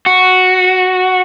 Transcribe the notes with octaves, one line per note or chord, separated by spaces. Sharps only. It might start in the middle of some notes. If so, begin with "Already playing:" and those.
F#4